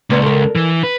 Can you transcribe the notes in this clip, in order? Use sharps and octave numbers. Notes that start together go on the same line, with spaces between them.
C#2 A#3 B3 D4
A4 A#4
E3
B4